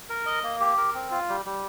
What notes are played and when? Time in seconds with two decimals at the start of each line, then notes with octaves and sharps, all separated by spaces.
0.09 A#4
0.26 D#5
0.43 A#3
0.60 G4
0.78 A#4
0.94 C4
1.11 F4
1.29 G3
1.45 G3